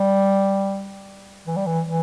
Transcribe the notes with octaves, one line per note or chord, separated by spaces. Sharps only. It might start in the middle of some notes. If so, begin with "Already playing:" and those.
Already playing: G3
E3
G3
E3
E3